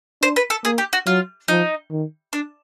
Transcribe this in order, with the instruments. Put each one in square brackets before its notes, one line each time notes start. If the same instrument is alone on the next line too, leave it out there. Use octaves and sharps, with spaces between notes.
[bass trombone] D4 [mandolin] C5
[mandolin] B4
A4
[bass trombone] A#3 [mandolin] G#4
[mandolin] G4
F#4
[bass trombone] F#3 [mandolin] F4
[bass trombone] F3 [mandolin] D#4
[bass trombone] D#3
[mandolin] D4